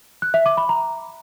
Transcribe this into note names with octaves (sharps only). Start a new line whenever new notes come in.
F#6
E5
D6
B5
A#5